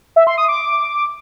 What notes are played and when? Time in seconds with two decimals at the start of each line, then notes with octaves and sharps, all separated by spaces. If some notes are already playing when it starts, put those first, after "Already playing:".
0.16 E5
0.27 C6
0.38 D#6
0.48 D6